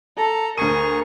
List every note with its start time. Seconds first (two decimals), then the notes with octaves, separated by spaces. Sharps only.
0.17 A4 A#5
0.58 D2 G#4 A#4 C#6 D#7